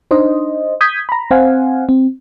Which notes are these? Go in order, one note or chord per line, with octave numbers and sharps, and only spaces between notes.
D4 D#4 C5 D#5
D#6 G6 G#6 B6
A#5 B5
C4 C5 F5 F#5 G#5
C4